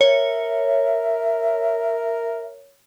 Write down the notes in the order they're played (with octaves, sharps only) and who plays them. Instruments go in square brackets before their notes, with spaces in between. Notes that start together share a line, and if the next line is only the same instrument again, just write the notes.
[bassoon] A#4 [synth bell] C#5 [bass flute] E5